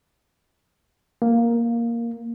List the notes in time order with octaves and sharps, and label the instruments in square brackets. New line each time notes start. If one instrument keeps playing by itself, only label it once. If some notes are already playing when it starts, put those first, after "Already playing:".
[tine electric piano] A#3